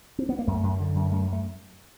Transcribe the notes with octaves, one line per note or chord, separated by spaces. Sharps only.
C4
B3
A#3
F#2 A3
F#2
D3
F#2
F#2 A3
F#2
A3